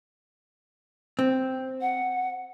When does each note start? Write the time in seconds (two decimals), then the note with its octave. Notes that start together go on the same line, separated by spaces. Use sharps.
1.19 C4
1.81 F#5